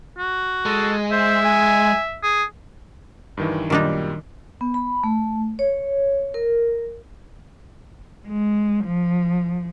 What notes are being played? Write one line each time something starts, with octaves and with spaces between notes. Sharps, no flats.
F#4
G#3 A4
C5 E5
G#5
G#4
G2 D#3 E3
F#2 A#2 D#3 G3 D4 D#4
B3
B5
A3
C#5
A#4
G#3
F3